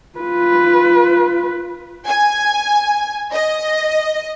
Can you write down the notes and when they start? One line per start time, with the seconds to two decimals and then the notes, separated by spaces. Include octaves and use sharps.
0.19 F4 B4
2.08 G#5
3.33 D#5